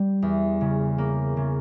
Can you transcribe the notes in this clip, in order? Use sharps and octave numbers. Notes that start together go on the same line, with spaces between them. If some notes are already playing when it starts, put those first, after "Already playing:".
Already playing: G3
E2
C#3
A#3
C#3